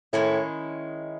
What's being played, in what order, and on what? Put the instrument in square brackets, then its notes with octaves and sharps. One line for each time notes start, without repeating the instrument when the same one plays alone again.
[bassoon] A2 [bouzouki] D#3 G#3 C#4 E4